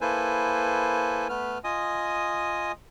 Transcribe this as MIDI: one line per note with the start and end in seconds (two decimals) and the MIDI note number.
0.01 1.28 58
0.01 1.28 64
0.01 1.28 69
0.01 1.28 71
0.01 1.28 72
0.01 1.28 80
1.29 1.58 57
1.29 1.58 59
1.29 1.58 71
1.29 1.58 89
1.64 2.72 65
1.64 2.72 75
1.64 2.72 80
1.64 2.72 87